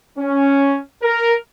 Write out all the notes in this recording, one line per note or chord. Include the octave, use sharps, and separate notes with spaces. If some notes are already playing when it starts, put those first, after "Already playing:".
C#4
A#4